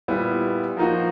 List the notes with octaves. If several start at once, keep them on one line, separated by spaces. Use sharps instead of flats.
A#2 G3 B3 E4
F3 A#3 D#4 F#4